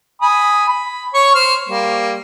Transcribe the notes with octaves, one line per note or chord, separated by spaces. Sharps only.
G#5 B5 D#6
B5
C#5 C#6
C5 F6
G3 A#3